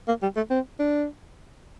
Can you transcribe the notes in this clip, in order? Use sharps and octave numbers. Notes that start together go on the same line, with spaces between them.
A#3
G3
A3
C4
D4